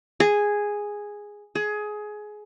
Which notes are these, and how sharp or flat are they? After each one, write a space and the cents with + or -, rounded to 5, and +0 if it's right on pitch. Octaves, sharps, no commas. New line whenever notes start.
G#4 -5
G#4 +20